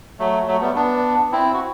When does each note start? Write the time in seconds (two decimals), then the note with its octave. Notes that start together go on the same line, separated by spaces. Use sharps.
0.19 F#3 A3
0.47 F#3 A3
0.61 G3 B3
0.76 B3 D4
1.32 C4 E4
1.53 F#4